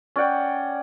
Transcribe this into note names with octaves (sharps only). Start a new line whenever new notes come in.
C#4 D5 F#5 G5